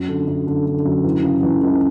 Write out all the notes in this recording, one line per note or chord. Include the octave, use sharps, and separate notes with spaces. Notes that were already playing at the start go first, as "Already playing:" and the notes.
Already playing: F#2
D3
F#2
D3
D3
F#2
E3
C#3
E3
C#2